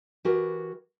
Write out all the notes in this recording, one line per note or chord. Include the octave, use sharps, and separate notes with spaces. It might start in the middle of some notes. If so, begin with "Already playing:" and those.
E3 F#4 G4 A#4